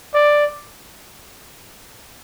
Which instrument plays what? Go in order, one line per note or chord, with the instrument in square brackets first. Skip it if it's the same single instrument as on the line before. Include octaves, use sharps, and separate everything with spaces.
[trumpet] D5